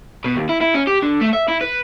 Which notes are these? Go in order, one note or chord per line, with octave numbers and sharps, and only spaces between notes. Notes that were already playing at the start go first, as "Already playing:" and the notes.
B2
D#2
E4
E4
C#4
G4
D3
A3
E5
E4
B4